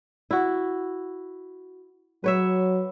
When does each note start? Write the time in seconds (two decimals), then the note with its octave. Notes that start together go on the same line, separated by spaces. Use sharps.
0.31 E4 F#4
2.24 F#3 B4 C#5 E5